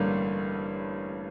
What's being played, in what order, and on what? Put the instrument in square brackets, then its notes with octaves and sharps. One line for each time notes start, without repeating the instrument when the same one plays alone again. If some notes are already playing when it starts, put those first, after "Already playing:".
Already playing: [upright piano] A1 G2 D3 G3 A#3